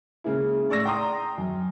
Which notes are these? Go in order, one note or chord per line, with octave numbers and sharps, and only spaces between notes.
C#3 G#3 A#3 E4
A2 D5 C#6 E6 A#6
G5 A#5 C6 D#6
F#2